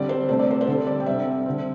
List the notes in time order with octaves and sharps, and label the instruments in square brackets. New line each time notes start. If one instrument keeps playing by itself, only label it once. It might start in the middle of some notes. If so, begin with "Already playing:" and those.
Already playing: [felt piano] D3 G3 C4 D5
C5
C3 A3 C4 C5
D5
C5
C5
D3 G3 C4 A4
D5
G5
C3 G3 C4 E5
D3 C4